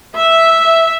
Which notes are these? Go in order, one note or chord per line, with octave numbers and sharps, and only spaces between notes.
E5